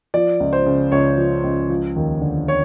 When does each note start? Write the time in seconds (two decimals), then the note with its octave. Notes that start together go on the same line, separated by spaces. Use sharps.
0.14 F3 D5
0.40 C#2
0.53 C5
0.66 C#3
0.92 C#2 C#5
1.18 F3
1.44 C#2
1.69 F3
1.96 D#2
2.21 D3
2.48 C#5